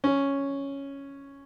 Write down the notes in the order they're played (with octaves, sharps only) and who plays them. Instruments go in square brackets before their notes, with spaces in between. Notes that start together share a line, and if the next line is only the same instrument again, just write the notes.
[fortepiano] C#4